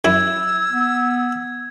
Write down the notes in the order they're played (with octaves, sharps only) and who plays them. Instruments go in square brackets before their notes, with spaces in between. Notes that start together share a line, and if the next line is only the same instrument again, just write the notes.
[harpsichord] F#2 E4 [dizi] E6 [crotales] G#6
[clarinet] B3